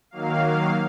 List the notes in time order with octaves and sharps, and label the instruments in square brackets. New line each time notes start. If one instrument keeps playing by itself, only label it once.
[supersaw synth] D#3 F#3 A#3 F5